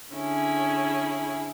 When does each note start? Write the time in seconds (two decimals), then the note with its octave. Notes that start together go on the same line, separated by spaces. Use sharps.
0.13 D3 C#4 E4 G#4